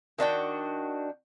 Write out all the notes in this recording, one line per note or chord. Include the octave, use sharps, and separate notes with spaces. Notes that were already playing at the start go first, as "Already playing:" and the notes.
D#3 D4 F#4 G5